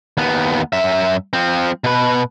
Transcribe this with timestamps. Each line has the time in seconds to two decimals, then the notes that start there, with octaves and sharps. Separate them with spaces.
0.17 D#2 B3
0.73 F#2 E5
1.33 F3 C4
1.84 B2 B4